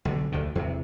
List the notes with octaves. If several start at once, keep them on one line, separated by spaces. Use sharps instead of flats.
B1 D3
D2 D3 D#3
E2 C3